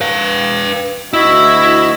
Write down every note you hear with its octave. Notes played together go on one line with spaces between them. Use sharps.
B4 F5
D2 E4 F#4 D#5 E5